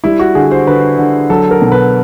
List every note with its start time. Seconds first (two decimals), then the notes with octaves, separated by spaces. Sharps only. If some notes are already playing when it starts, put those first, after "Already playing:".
0.04 G3 E4
0.19 F#4
0.35 D3 G#4
0.51 C5
0.67 D3 B4
0.98 D3
1.30 F#3 A4
1.51 A#4
1.62 B2
1.72 B4